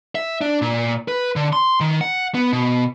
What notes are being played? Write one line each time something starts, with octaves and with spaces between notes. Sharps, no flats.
E5
D4
A#2
B4
D3
C6
D#3
F#5
B3
B2